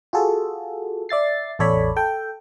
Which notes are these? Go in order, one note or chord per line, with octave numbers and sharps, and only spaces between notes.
F4 F#4 G#4 A4
D5 E5 A6 C7
A1 E2 A4 C#5 D5 B5
A4 G5